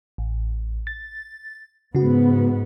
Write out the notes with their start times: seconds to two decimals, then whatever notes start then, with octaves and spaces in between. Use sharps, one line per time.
0.18 A1
0.87 A6
1.95 G#2 C#3 B3 F#4